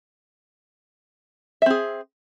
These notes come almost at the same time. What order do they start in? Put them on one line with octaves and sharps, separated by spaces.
E5 C4 G#4